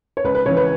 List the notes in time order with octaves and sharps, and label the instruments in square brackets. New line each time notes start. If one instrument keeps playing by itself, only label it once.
[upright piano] C#5
C#2 B4
B4
C#3 C#5
E3
B4